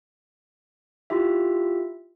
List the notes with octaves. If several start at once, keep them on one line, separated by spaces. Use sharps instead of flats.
E4 F4 G4 E5